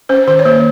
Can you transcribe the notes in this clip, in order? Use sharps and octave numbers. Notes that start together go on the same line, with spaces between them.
C#4 C5
D#3 C5
C#5
A#3 C5